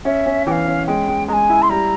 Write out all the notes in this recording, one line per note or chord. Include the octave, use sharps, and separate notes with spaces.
C#4 E5
C#4
E3 F5 G5
C#4
G#3 G5
G#3
G#3 G#5 A#5
E4
C6
G3 A#5